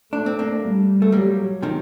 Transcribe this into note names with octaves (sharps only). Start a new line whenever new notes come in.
A3 D4
C4
A#3 D4
G3
A3
F#3 G3 A#3
C3 D#3